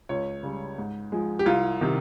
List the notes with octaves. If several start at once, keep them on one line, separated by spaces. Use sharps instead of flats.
C#2 C#5
C#3 G3
G#2
F3 G#3
G4
C2 F4
C3 D#3